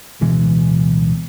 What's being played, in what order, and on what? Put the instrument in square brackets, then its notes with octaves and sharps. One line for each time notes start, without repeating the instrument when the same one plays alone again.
[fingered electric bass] D1 B2 E3 G#3